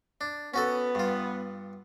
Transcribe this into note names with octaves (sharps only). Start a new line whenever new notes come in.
D4
B3 C#4 F#4 A4
G2 F4